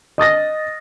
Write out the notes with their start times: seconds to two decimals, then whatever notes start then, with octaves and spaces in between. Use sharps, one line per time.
0.18 D#5 D#6 A6 A#6